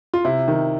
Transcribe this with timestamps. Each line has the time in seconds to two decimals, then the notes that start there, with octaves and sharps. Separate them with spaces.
0.14 F4
0.25 C3 E4
0.48 D#3